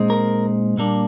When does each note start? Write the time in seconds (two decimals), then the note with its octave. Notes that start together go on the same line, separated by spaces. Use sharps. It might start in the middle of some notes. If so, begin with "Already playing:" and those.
Already playing: A#2 G#3 C4 D#4
0.10 A#4
0.77 A#2 G3 A#3 D4